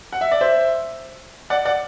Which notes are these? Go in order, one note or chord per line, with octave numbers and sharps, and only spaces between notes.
F#5
E5
D5
C5 E5
D5 F#5
D5 F#5